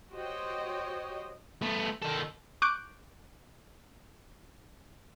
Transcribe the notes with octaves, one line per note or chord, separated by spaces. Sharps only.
F#4 G4 C5 C#5 D#5 G5
A3 B3
D#3 A4
C#6 D6 F#6 G6 D7